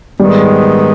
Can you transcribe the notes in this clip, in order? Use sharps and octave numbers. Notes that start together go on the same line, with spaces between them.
G#2 D#3 G3 G#3 B3